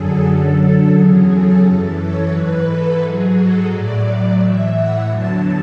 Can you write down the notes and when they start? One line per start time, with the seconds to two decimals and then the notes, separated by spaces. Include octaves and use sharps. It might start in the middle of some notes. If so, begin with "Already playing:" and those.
Already playing: F#2 D3 F#3 G#4 A4
0.25 F#2 D3 F#3
0.94 E2 C#3 F#3 G#4
1.29 A4
1.63 F#2 E3 A4
1.98 C#5
2.32 G#2 E3 B4
2.67 A4
3.00 G#2 F#3 G#4
3.36 A4
3.70 A2 F#3 D5
4.38 A2 E3 E5
4.72 F#5
5.07 E2 D3 F#3 A5